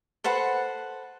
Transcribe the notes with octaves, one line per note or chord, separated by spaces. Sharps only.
A4 B4 C5 F#5